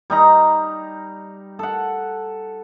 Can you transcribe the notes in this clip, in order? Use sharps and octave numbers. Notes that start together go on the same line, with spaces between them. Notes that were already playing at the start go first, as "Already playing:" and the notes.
G3 D#4 A#5
A4 F#5